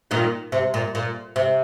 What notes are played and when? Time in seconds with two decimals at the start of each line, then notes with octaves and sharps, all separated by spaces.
0.11 A#2 D#3
0.52 C3
0.74 A#2
0.95 A#2
1.36 C3